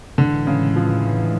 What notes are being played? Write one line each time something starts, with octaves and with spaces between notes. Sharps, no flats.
A2 D3 E3 G#3
C#3
F3